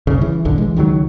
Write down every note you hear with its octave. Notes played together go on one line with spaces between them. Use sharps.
F#1 C2 C#3
E3
F#1 B1 E2 D3
E3 G#3
C#2 D#3 E3 F#3